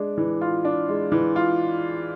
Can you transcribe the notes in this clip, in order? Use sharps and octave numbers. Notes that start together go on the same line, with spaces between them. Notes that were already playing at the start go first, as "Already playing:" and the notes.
Already playing: G#3 D4
E3
F4
D4
G#3
E3
F4